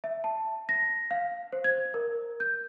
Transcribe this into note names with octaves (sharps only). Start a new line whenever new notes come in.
E5
A5
A#6
F5
C5
G#6
A#4
G6